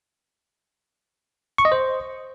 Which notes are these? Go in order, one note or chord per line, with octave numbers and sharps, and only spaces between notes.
C#6
D#5
C5